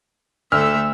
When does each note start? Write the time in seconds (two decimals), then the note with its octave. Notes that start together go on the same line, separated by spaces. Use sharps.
0.52 D2 A3 E5 E6 F6